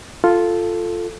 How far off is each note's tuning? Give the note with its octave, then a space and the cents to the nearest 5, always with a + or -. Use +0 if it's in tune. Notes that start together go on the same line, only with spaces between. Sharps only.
F4 +0 A4 +0